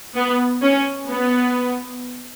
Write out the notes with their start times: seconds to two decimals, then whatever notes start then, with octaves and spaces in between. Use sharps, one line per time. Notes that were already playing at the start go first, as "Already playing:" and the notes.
0.15 B3
0.62 C#4
1.09 B3